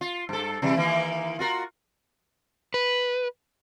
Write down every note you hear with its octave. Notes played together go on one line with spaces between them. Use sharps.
F4
G2 A4
C3 E3 G3
D#3 E3 A#3
F4 F#4 A#4
B4